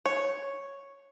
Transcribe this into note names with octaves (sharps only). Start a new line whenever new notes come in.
C#5